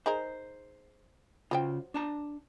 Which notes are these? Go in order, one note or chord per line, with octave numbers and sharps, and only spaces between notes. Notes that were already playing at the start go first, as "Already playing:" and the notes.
D#4 G#4 A#4 C5
C#3 F#3 F4 C5 G5
D4 A5 A#5